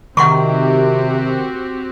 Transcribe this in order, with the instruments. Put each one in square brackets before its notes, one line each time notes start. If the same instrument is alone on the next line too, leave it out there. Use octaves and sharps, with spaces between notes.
[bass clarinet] C3 [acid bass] D#3 [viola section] C4 F#4 G4 [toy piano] F#5 C6 C#6